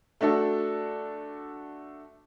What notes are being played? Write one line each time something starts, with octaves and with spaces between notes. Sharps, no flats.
A3 D4 F#4 A4